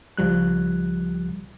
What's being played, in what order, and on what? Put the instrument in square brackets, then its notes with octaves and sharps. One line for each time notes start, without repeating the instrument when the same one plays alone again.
[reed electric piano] C#2 F3 G3 F#6